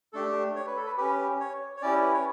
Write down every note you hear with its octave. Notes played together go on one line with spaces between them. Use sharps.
A3 D4 G4 A4
C#5
B4
A4
B4
C#4 G4 B4
C#5
C#5
C#4 E4 G4 D5
B4
C#5